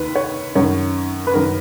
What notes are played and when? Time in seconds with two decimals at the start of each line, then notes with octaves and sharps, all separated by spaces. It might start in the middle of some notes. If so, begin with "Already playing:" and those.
Already playing: D#2 D#3 B4
0.15 C#5
0.55 F#2 D#3 C#5
1.27 B4
1.34 F#2 D#3 A#4